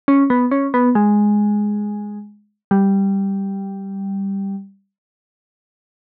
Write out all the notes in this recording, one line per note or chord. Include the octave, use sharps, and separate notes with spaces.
C#4
B3
C#4
B3
G#3
G3